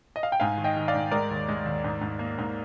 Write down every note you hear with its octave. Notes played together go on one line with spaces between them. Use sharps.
D#5
F5
G5
G#2 F5 G#5
D#3
D#5 G5
D#3
D5 F5
G#2
G#3 A#4 D5
D#2
G#3
D#2
G#2
G#2
A#3
G#2